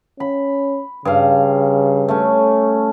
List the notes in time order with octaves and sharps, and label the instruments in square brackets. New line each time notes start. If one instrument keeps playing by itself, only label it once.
[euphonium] C#4 [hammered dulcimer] B5
[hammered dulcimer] G2 F5 [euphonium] C#3
[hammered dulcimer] A3 C#4